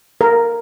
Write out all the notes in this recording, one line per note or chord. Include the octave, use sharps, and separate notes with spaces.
A#4